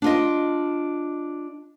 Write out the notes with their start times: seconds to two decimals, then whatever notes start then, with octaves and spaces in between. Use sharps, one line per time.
0.02 D4 F4 D#5